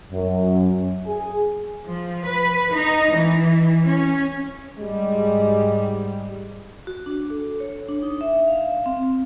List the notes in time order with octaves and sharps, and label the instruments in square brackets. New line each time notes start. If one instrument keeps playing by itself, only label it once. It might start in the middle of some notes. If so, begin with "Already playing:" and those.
[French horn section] F#2
G#4
[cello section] F3
B4
D#4
E3
C#4
[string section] G#2 G3 [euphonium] G#3
[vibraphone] F#4
D4
A4
C#5
D4
D#4
E5
F5
C4